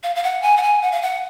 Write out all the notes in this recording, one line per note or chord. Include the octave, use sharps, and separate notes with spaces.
F5
F5
F#5
G#5
F#5
G#5
F#5
F5
F#5